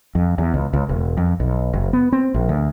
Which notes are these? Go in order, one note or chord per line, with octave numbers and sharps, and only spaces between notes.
F2
E2
C#2
C#2
E1
F2
B1
F#1
B3
C4
A#1
D2